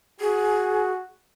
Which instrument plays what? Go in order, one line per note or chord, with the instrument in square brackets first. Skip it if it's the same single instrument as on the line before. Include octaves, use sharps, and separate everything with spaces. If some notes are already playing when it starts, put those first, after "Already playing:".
[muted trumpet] F#4 [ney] G#4